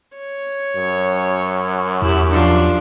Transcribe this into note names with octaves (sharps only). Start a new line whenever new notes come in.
C#5
F#2
E2 E4 G4
F3 D4